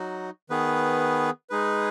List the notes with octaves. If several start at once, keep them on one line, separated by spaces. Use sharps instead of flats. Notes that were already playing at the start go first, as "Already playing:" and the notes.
Already playing: F#3 D#4 F#4
D#3 B3 G#4 B4
G#3 D#4 G#4 B4